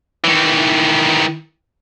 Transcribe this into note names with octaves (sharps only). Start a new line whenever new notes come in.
D#3 E3